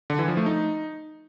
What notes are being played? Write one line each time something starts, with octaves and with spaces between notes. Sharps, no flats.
D3
E3
F3
A3
D#4